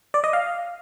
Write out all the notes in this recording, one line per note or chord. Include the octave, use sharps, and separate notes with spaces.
D5
D#5
F5